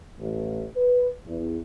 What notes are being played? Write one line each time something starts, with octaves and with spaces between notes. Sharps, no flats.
A1
B4
E2